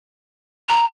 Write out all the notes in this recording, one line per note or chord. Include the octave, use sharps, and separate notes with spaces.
A#5